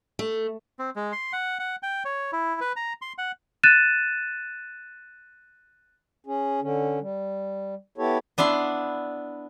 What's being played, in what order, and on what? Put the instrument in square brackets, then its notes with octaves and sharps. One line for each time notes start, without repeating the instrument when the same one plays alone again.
[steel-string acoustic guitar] A3
[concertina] C4
G#3
C6
F#5
F#5
G5
C#5
E4
B4
A#5
C6
F#5
[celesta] F#6 A6 D#7 E7
[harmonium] C#4 G#4
D3 C#4
G3
B3 E4 G4 A4 C#5
[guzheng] B3 D4 E4 C6